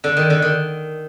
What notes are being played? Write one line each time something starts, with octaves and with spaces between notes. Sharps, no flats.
D3
D#3
D3
D#3